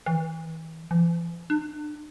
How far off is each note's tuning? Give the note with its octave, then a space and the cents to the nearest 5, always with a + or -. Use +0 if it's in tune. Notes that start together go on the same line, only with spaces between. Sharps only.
E3 -30
E3 +45
D4 +35